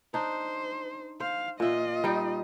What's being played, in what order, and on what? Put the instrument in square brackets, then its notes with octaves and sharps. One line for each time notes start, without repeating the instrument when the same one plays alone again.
[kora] D4 D#4 [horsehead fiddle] C5
[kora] C5 [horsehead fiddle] F5
[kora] A#2 E5 [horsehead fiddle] F4 D#5
[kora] G3 D#4 G5